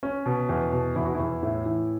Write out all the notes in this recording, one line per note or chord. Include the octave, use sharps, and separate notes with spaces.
C#4
B2
E2
B2
E2 E4
F#4
E2 E4
A2
E3